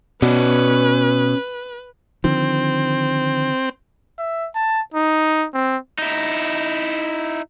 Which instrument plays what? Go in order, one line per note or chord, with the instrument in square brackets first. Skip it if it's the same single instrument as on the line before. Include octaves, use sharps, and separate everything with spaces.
[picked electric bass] B2 [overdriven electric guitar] C#4 D5 [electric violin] B4
[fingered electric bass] D3 D#3 F3 [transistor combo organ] C4
[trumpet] E5
A5
D#4
C4
[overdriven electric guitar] D#4 E4